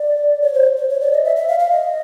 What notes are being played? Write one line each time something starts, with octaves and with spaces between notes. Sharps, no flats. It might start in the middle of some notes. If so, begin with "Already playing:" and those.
Already playing: D5
C#5
C5
C5
C#5
D5
D#5
E5
E5
F5
F5
D#5